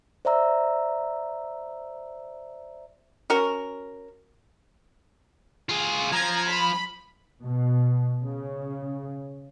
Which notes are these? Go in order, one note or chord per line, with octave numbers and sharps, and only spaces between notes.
C5 D5 E5 A#5 E6
C#4 F#4 A#4
F4 G#4
F3 A#5 G#6
B5
B2
C#3